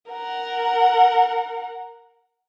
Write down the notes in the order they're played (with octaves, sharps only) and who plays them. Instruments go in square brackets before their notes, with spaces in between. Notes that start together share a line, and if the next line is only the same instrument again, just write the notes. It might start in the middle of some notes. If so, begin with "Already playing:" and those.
[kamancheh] A#4 F#5